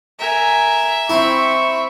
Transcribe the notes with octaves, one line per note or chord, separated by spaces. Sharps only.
A#4 E5 G#5
C4 E4 C#6